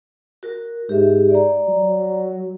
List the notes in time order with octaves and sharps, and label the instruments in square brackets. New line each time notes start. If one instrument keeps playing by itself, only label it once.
[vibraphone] F#4 A#4
[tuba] G#2 [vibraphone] G4 E5
[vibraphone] D5 A#5
[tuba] F#3